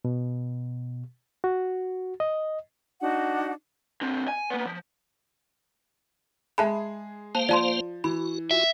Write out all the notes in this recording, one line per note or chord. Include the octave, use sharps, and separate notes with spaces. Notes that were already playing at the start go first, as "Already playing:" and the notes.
B2
F#4
D#5
D4 D#4 F#4 F#5
D3 C4
G#5
A#3 B3
F3
G#3 G#4 E5 A5 B5
A#3 C5 F5 A5
F3 D5 A5 C6
E3 F#4 B5
F4 F#4 E5 G#5